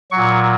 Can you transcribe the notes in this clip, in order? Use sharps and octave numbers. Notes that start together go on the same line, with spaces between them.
A#2 F#3 C#6